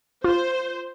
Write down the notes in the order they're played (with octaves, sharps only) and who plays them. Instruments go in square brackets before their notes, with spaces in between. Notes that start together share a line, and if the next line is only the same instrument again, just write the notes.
[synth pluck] F4 [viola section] C5